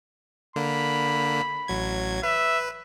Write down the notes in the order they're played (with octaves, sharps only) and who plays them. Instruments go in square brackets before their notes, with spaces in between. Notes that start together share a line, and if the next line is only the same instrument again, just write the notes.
[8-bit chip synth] D3 A#3 [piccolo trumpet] B5
[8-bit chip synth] A1 F#3 G#6
[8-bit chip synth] B4 [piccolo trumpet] E5